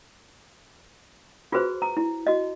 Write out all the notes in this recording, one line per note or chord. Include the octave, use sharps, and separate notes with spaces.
F4 F#4 G#4 B4 C5
A#5
E4
F#4 D#5